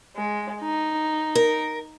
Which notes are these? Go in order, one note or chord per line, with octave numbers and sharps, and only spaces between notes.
G#3
D#4
A#4